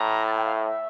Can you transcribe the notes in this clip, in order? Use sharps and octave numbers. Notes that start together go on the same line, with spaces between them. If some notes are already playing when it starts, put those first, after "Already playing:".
Already playing: A2 A#5
A5
G5
F5
E5
E5